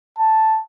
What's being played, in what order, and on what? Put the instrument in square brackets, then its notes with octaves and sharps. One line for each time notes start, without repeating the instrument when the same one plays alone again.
[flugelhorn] A5